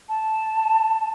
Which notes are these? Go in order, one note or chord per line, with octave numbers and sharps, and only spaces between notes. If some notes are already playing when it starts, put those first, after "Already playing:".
A5